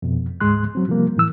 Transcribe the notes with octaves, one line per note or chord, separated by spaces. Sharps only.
F2 B2
D2 G#2 G#3 C6 F#6
F#3 C4
C3 F3 G3 A#3
A2 E3 E6